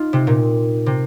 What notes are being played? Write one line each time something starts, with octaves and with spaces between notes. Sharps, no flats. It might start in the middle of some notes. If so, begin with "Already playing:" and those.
Already playing: D#4 F4
C3
A#2
C3